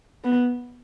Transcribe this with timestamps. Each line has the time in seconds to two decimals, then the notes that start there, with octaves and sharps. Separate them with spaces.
0.24 B3